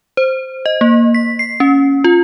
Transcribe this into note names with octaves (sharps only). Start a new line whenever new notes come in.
C5
D#5
A#3
B6
C7
C#4
F4